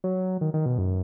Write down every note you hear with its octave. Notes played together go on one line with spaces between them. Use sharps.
F#3
D#3
D#3
B2
F#2